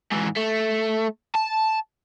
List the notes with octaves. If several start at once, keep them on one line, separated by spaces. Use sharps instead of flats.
G#2 E3
A3
A5